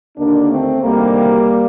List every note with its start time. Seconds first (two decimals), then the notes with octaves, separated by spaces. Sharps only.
0.17 D#2 D3 A#3 D4
0.49 A3 C4
0.81 D2 C3 D#3 G3 A#3